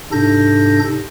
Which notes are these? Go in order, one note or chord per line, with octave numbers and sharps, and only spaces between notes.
G#2 C3 D4 A4 G6 A#6